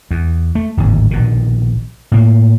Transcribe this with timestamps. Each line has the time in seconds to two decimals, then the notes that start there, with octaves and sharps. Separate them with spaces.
0.11 E2
0.55 A3
0.77 D1 G#1 D#2
1.11 A#1 B2 D#3
2.12 A2 A#3